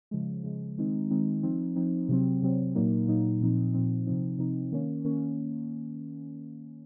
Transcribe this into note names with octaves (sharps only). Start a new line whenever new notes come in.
C#3 F3 G#3
C#3 F3 G#3
D#3 G#3 C4 D#4
D#3 G#3 C4 D#4
F3 C4 D#4
F3 C4 D#4
C3 F#3 C4
C3 F#3 C4
A#2 F#3 A#3 D#4
A#2 F#3 A#3 D#4
A#2 F3 C4 D#4
A#2 F3 C4 D#4
C3 F3 C4 D#4
C3 F3 C4 D#4
D#3 A#3 C#4
D#3 A#3 C#4